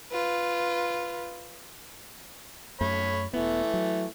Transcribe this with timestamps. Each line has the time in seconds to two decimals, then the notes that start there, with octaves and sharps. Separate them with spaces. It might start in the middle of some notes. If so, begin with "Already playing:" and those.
0.12 F4 B4
2.81 F#2 A3 C#5 B5
3.33 E1 E3 A3 B3
3.74 F#3